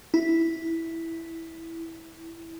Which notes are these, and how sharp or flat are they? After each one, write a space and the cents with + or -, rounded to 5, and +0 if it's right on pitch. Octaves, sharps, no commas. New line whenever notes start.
E4 -5